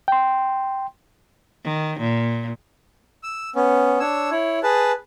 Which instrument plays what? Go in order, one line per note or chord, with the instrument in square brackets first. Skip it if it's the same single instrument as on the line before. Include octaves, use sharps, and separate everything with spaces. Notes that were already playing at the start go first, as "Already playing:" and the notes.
[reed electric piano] G5 C6
[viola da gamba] D#3
A#2
[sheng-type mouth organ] E6
B3 C#4
D4 C#5 E6
E4 C#5
G#4 B4 A5